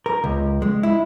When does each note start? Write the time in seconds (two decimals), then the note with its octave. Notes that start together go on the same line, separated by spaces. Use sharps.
0.06 A#4
0.24 C#2
0.62 G#3
0.83 E4